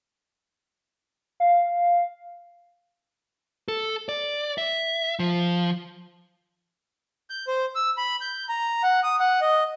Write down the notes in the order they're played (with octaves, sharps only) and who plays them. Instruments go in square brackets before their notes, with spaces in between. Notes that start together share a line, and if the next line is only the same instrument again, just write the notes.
[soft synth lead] F5
[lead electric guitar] A4
D5
E5
F3
[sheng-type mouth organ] G6
C5
E6
B5
G6
A#5
F#5
D#6
F#5
D#5